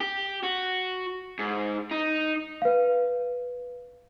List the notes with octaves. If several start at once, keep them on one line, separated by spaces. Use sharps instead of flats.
G4
F#4
G#2
D#4
B4 F5